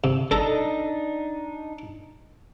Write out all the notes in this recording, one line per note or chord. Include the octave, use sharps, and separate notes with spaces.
C3
D4 D#4 A4 A#5